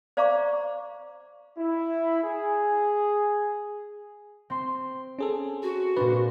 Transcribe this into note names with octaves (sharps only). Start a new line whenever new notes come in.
C5 D5 F5 A#5 C#6 D6
E4
G#4
C4 C6
C#4 G#4 A4
F#4
A#2 C4 D4 B4